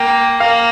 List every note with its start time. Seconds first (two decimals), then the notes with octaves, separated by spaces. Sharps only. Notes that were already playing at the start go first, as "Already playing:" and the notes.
Already playing: A#3 G5
0.40 A#3 F5